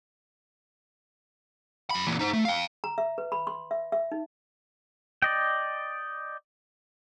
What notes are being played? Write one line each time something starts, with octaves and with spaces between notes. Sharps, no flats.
F#2 B5
A#2 E3
D#4 C5
A3
F5 G5
A#5
E5
B4
B5
C6
E5
E5
D#4
D5 D#5 G5